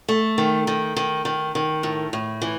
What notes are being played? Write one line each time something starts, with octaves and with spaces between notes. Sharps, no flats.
A3
D#3
D#3
D#3
D#3
D#3
A2
A2
E3